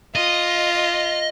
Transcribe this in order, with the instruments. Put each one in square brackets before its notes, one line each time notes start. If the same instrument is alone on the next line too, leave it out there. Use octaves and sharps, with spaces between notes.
[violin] F4 [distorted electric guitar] D#5